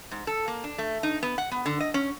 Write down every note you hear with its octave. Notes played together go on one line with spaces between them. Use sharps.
G#2
A4
A#3
D4
A3
D#4
B3
F#5
B3
D3
D#5
C#4